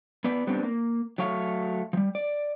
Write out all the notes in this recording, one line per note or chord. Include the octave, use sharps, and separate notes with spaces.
B3 B4 D5
G3 B3 C4 D4
A#3
F#3 A3 C#5 F5
F3 G3
D5